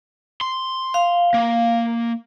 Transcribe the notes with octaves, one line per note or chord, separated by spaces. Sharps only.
C6
F5
A#3